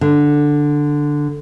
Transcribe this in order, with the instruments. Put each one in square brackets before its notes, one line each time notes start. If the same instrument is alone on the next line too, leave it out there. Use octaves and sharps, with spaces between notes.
[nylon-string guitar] D3